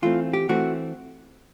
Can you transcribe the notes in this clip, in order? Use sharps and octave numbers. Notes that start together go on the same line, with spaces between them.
E3 A3 C4 F4
G4
E3 A3 C4 F#4